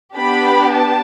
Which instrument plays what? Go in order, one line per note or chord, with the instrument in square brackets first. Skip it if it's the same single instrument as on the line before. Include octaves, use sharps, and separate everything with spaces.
[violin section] B3 D4 G4 B5
A5